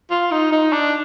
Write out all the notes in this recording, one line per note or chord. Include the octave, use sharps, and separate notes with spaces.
F4
D#4
D#4
D4